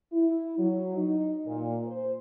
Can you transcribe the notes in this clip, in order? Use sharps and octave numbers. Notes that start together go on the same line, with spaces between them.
E4
F#3
D#4
A#2
C5